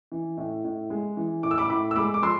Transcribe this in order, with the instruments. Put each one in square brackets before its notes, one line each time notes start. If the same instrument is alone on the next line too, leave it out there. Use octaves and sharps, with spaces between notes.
[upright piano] E3
A2
A2
G#3
E3
A2 D6
E6
B5 D6
A2 B5 D6
E6
G#3 B5 D6
D6
F3 C6 E6